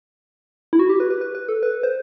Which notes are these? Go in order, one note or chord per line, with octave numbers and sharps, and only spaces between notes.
E4
F#4
G4
B4
B4
B4
B4
A4
B4
C5